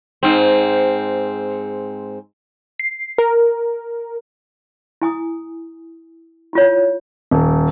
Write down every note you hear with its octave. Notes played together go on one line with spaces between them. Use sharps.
G#2 C4
C7
A#4
E4 G#5 D#6
E4 F4 C#5
D#1